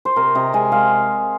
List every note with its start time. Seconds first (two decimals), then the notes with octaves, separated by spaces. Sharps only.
0.05 C5
0.16 C3 A#4
0.35 C3 D#5
0.53 G#3 G#5
0.72 G#3 F5